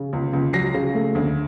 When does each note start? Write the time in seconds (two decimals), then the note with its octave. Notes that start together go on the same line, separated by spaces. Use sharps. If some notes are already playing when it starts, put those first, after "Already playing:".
Already playing: C#3
0.13 C#2
0.33 C#2
0.53 F#3 A#6 C7
0.74 C#3
0.94 A3
1.15 D2